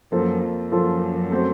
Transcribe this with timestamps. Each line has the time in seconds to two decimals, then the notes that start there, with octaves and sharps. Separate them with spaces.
0.12 F#2 F3 A#3 F4 A4 C5
0.42 F2
0.72 F#2 F3 A#3 F4 A4 C5
1.31 A3 C4 F#4 A4 C5